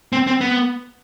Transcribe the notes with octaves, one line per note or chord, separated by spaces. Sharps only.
C4
C4
B3